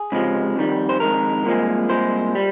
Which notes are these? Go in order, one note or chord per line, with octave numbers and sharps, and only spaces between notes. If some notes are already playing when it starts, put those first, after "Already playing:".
Already playing: G#4
C#2 C3 F3 G#3
F2 D#3 G3
C5
F2 D#3 G#3 A#4
C2 A#2 F3 G#3
C2 A#2 G#3 C5
G3